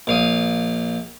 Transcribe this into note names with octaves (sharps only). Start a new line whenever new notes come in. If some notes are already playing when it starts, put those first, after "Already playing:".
A#1 F5 D#6